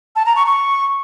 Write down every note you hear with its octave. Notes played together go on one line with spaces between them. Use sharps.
A5
A#5
C#6
C#6